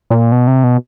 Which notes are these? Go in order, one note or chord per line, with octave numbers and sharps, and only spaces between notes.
A#2
B2
C3
B2